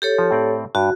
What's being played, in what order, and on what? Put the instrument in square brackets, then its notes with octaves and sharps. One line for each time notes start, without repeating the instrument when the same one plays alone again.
[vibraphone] G4 A4 C#5
[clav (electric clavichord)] F3
A2 C4 D5
[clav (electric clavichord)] G2 [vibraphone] F#4